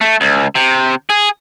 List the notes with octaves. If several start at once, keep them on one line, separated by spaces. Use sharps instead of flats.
A3
C#2
C3
G#4